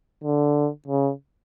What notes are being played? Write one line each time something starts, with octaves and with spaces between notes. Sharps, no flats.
D3
C#3